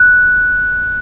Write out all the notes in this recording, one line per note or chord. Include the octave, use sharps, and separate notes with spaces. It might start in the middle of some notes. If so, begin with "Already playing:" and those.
Already playing: F#6